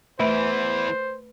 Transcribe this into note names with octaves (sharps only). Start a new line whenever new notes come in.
E2 E3 A3 B4 C5 B5 D7